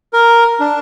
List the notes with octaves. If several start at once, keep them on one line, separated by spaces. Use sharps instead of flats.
A#4
D4